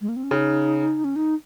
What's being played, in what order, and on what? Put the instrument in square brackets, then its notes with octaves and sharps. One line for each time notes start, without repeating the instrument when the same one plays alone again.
[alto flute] G#3
A#3
C4
C#4
[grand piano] C#3 [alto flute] D#4
[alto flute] C#4
D#4